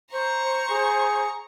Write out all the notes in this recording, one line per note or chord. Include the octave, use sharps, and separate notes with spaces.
C5 A#5 C#6
G#4